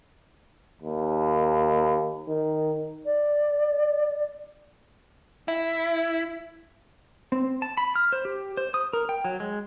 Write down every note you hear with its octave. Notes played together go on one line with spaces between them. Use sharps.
D#2
D#3
D5
E4
C4
A5
B5
F6
C5
G4
C5
D#6
A#4
G5
F#3
G#3